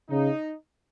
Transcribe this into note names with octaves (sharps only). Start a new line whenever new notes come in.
C#3 D#4